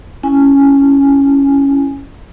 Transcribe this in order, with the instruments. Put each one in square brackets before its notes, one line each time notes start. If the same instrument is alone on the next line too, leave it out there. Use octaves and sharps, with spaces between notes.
[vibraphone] C#4 E4 G#5